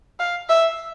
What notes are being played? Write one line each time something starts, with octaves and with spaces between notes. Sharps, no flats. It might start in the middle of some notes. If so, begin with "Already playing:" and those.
F5
E5